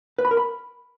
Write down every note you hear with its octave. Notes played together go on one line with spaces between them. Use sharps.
B4
B5
A#4
B5